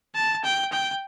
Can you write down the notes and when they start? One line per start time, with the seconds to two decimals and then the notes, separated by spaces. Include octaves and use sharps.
0.15 A5
0.44 G5
0.72 G5